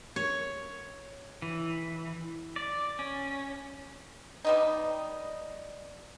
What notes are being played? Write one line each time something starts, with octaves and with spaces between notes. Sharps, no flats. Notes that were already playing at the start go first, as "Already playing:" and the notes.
C#5
E3
D5
C#4
G3 B3 D#4